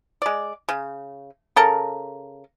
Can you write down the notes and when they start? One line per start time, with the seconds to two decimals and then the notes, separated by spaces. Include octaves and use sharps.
0.22 G#3 D5
0.69 C#3
1.56 C#3 A4 A#4